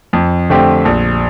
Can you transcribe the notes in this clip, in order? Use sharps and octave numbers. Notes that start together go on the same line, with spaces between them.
F2
D3 A3 C4 G4
A#1